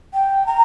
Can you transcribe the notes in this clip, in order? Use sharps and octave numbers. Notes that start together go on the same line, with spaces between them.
G5
A#5